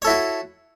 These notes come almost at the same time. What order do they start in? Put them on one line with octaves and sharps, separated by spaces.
C#5 A4 E4 F#4